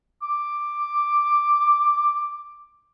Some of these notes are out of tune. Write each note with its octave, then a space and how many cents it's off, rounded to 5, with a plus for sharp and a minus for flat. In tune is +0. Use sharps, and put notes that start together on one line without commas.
D6 +5